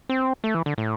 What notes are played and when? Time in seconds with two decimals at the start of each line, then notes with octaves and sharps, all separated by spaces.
0.09 C4
0.44 A3
0.55 E3
0.66 D3
0.78 A2